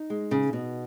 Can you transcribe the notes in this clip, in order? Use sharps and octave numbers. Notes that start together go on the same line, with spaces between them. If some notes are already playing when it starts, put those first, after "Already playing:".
Already playing: D#4
G#3
C#3
B2